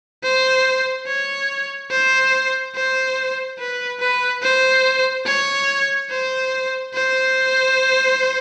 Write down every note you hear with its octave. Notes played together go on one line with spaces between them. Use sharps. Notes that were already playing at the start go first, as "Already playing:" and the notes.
C5
C#5
C5
C5
B4
B4
C5
C#5
C5
C5